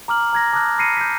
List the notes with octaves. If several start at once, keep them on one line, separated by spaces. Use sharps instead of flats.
A#5 D6 F6 F#7
A#5 G#6 A#6
A5 D6 D#6 F6 F#6 A#6
B5 F6 A#6 C7 C#7 D#7
G6 B6